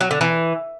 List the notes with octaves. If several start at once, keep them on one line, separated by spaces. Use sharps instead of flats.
F#3
D3
E3